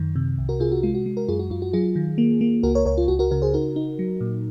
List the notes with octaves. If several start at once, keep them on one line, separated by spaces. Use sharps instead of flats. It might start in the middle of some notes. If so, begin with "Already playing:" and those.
Already playing: F#2 D#3
C3
C2
F#4 A#4
C3 F4 G#4
F#4
G#3 F4
F#4
G#3
F#4 A#4
F#2 F4 G#4
F#4
F#2 F4
F#4
F#3 F4 G#4
D#3
A#3
A#3
C#2 F#4 A#4
A#4 C#5
C#2 A#4 C#5
F4
C#2 F#4
F#4 A#4
C#3 F#4 A#4
G#4 C5
D#4 F#4 A#4
D#4
F#3
A#2